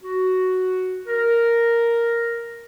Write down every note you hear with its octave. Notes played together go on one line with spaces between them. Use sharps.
F#4
A#4